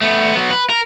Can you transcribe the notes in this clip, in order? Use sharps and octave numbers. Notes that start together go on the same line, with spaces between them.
A3 B3
F#3 B3
B4
A#4